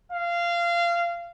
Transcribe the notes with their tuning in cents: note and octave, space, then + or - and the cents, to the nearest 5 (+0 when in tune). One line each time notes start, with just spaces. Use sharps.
F5 -20